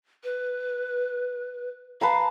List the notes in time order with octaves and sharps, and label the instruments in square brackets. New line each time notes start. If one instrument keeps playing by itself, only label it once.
[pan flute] B4
[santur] B4 A5 A#5 [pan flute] F5